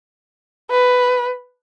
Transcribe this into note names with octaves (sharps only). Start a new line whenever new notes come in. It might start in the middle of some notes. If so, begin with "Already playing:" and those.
B4